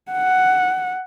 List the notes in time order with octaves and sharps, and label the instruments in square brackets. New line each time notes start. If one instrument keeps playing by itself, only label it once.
[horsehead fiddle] F#5